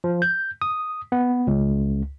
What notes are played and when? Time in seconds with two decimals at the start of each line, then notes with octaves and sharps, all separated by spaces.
0.04 F3
0.22 G6
0.62 D#6
1.12 B3
1.47 C#2